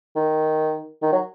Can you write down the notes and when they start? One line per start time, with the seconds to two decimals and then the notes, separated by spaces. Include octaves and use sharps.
0.16 D#3
1.02 D#3
1.12 F#3